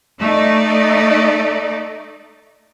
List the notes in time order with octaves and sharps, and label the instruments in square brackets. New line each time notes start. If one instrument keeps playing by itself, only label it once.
[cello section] A3 D#4 D5